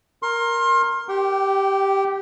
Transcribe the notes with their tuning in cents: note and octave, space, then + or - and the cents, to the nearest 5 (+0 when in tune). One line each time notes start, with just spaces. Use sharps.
A#4 +0 C6 +30
G4 +0 G5 -30